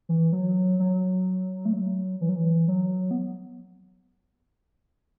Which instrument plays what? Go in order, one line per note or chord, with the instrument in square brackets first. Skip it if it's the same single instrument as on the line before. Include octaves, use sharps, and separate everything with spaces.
[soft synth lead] E3
F#3
F#3
A3
F#3
E3
F#3
E3
F#3
B3